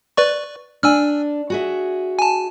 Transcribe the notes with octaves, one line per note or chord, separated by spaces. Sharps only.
B4 D5 C#6
D4 G#5 E6 F6
F#4 G#4 E5
G#5 A5